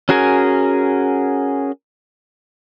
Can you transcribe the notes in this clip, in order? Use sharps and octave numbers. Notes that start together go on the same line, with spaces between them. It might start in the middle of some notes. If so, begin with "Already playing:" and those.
C#4 F#4 G#4 A#4 G#5